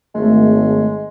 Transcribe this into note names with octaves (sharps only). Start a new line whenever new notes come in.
G#1 G#3 A3